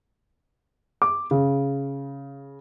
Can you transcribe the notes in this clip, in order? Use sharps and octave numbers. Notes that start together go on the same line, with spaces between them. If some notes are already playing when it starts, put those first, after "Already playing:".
D6
C#3